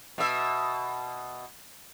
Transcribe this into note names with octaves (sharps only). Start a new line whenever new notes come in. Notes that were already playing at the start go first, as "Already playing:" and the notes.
B2 E5